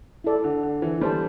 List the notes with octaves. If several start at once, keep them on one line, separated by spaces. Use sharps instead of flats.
E4 A4 D5
D3
D3
E3
G3 A4 C5 A5